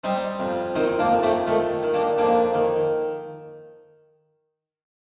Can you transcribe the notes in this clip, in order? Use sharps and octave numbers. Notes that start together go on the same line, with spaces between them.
G3 C4 D#4
F2
D#3 C4 D#4
A#3 D4
F2
A3 C4
D#3 A3
D#3
A#3 D4
F2 A#3 D4
D#3